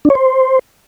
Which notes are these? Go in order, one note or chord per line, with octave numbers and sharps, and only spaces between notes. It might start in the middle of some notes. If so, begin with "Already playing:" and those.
D4
C#5
C5